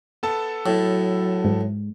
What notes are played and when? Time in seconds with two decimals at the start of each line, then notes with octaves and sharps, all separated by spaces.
0.23 B3 A4 A5
0.66 A2 F#3
1.44 G#2